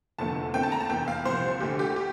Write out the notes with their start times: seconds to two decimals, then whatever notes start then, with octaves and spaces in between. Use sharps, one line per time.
0.18 F1 E2 D3 F3 A3 A5
0.54 E2 D3 A3 C4 G5
0.63 A5
0.72 A#5
0.80 A5
0.90 F1 E2 E3 G5
1.08 F5
1.25 C2 A#2 F3 C5
1.60 D2 D3 A3 G4
1.79 G4
1.96 G4